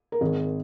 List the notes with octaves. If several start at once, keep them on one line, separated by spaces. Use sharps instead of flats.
A#4
G#1 G#4